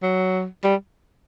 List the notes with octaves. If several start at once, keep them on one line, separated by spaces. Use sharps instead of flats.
F#3
G3